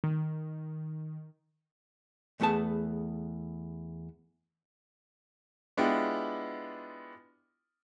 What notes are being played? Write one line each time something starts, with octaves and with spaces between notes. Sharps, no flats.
D#3
E2 A3 B3 G#4 A5
G#3 B3 D4 E4 F4 G4